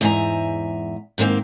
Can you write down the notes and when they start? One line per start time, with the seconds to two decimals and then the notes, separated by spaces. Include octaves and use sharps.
0.01 E2 G#2 C5 E5 G#5 A#5
1.18 G#2 D#3 A#3 C4